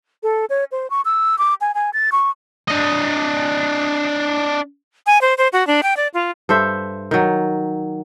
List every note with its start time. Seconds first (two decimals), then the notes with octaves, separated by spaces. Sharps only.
0.23 A4
0.50 C#5
0.72 C5
0.90 C#6
1.05 E6
1.38 D6
1.61 G#5
1.75 G#5
1.93 A6
2.12 C#6
2.68 D4 D#5
5.06 G#5
5.21 C5
5.38 C5
5.53 F#4
5.67 D4
5.83 G5
5.97 D5
6.14 F4
6.49 G2 A4 C5 E5
7.11 D#3 F#3